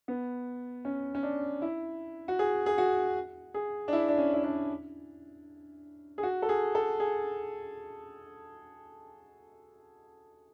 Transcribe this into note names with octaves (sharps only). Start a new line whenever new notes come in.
B3
C#4
C#4
D4
E4
F#4
G#4
G#4
F#4
G#4
D4
E4
D4
C#4
E4
D4
G#4
F#4
A4
G#4
A4
G#4